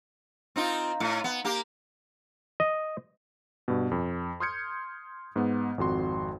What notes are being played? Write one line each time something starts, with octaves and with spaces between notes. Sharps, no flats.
C4 D#4 F4
A2
B3
A#3 G4
D#5
G2 B2
F2
C6 D#6 F6 G6 G#6 C#7
G#2 B3
G#1 F2 F#4 C6